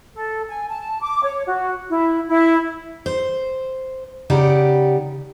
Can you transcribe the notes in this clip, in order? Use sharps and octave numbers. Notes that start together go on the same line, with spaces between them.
A4
G#5
A5
D6
C#5
F#4
E4
E4
C5
C#3 D#4 G4 D5 F#5